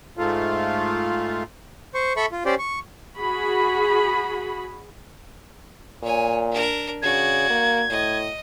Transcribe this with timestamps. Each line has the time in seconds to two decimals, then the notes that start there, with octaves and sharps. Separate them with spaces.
0.17 G#2 A3 F4
1.94 C5 C#6
2.16 A4 E5 B5 C#6
2.32 F4
2.46 C#4 G4 C5 D5
2.59 C#6
3.18 F#4 G#4 B5
6.03 A#2 C#5 G#5
6.51 D4 A#4
7.02 C#3 F#4 D5 G#6
7.50 A#3
7.90 A2 D#5